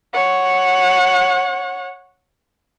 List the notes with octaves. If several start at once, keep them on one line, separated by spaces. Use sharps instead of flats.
C#5 F#5